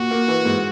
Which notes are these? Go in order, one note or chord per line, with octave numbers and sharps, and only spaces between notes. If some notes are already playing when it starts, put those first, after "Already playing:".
Already playing: A#2 F#4
A#3
E3
G#2